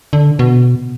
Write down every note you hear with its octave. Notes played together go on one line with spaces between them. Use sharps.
D3
B2